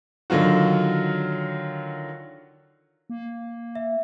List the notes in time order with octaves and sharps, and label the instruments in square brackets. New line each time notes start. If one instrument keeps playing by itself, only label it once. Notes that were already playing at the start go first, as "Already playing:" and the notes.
[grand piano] D3 D#3 F#3 F4 F#4
[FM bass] A#3
[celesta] E5